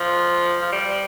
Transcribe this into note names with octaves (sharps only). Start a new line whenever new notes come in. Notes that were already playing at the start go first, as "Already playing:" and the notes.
Already playing: F3
F3
G3